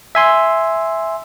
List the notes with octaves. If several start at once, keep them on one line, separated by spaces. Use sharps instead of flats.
E5 G#5 C6